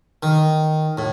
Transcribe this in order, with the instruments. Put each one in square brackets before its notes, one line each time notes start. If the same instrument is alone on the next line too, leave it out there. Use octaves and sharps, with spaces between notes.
[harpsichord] D#3
A2